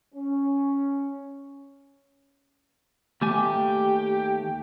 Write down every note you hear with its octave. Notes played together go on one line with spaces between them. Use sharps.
C#4
D#2 A3 G4 G#5